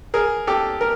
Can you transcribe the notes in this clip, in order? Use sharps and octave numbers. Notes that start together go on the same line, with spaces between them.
G#4 A#4
G4 A4
A#4